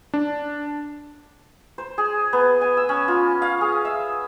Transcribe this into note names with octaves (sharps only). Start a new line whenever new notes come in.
D4
C5
G#4
B3
G#5
E6
C#4
F4
F5
G#4
E5